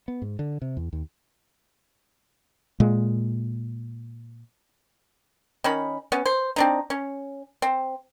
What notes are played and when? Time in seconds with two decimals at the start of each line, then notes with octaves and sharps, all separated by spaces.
0.08 B3
0.22 G#2
0.39 D3
0.62 C3
0.77 E2
0.93 D#2
2.80 A#2 G#3
5.64 D#3 C#4 B5
6.12 B3 C#4
6.26 C5
6.56 C4 D4 D#4
6.90 C#4
7.62 C4